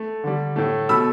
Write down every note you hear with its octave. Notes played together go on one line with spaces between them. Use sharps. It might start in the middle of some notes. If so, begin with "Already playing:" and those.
Already playing: A3
D3 G3
A2 A3
B2 A3 B5 E6